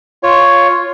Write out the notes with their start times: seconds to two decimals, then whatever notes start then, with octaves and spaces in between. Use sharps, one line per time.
0.23 F4 C#5